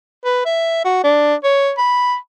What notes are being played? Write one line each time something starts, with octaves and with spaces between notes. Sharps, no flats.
B4
E5
F#4
D4
C#5
B5